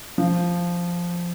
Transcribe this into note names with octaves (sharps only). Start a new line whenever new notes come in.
F3